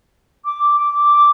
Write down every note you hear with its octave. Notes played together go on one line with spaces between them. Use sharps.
D6
D6